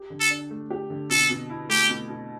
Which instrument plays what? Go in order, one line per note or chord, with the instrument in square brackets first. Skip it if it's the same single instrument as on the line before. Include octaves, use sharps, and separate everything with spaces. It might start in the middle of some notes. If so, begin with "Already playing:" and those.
Already playing: [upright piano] G4
D3
[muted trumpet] A4
[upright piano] D4
A3
G4
D3
[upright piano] B2 [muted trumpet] A4
[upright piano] B2
E4
[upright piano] A3 [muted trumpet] G4
[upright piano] B2
B2